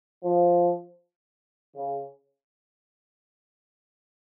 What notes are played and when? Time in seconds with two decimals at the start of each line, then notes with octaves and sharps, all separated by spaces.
0.24 F3
1.75 C#3